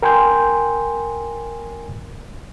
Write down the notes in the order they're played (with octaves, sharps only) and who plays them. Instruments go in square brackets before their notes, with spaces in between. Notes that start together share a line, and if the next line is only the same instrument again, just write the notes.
[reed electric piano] A#4 G5 G#5 C6 G6